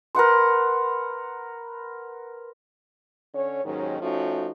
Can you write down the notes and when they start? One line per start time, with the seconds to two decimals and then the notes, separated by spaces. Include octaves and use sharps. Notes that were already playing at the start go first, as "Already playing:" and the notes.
0.15 A#4 B4 F#5 C6
3.34 D3 C#4 C#5
3.65 D#2 G#2 D#3 F#3 C#4
4.01 F3 A3 C#4 D#4 F#4